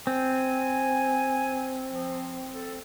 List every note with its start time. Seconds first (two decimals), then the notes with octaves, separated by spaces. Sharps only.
0.07 C4 G#5
1.89 F3
2.54 A4